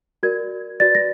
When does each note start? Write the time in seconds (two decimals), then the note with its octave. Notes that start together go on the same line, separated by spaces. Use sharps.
0.23 F#4 A#4 D5 G#6
0.80 F#4 B4 D5 A6
0.95 A#6